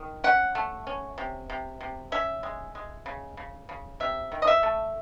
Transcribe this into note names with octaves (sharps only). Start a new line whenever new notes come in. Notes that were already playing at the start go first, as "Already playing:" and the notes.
Already playing: D#3
C#4 F#5
A3
C#4
C3
C3
C3
C#4 E5
G#3
G#3
C#3
C#3
C#3
C3 E5
D#3
D#5
E5
A3